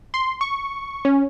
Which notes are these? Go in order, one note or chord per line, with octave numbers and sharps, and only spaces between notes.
C6
C#6
C#4